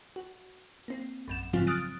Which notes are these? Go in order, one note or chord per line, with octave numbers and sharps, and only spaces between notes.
F#4
A#3 C4
A#1 F#2 E7
G#2 C#3 F3 F#3 C4 F4
D#6 F6 F#6 A6 D7